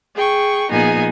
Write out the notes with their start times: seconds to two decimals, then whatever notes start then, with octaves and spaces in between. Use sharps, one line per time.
0.14 G#4 G5 C#6
0.70 A#2 F3 B3 D#4 G#4